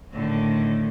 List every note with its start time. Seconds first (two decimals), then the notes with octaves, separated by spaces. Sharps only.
0.13 A2 D3 D#3